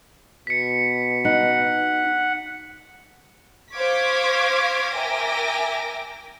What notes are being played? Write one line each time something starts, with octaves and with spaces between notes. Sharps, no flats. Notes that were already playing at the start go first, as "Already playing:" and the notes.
B2 B6 C#7
D#4 F#5 C#7
C5 F5 C#6 D6 G#6 B6
A#4 E5 G5 G#5 D6 A#6